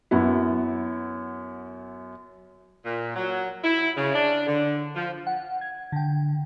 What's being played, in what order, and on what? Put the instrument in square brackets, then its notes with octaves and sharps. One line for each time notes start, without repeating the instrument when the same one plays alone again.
[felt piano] F#2 B3 E4
[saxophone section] A#2
F#3
E4
C#3
D4
D3
F3
[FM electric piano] F#5
G#6
D3 G5